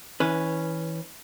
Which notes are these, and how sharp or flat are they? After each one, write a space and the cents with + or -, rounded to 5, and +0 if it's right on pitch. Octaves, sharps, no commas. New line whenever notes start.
E3 -25 C#4 +0 B4 +0